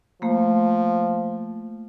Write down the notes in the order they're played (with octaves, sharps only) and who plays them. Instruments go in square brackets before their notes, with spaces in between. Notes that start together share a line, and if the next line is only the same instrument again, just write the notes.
[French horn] F3 [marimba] A3 A#3